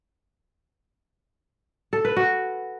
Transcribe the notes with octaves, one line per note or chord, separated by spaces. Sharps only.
A4
B4
F#4